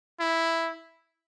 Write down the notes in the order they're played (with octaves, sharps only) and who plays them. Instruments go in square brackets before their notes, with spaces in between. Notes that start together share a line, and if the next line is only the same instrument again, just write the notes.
[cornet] E4